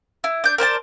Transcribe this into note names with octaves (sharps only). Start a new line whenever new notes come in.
E4
D4 G6
A#4 C5 D5 A5